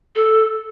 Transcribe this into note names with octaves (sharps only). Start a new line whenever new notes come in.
A4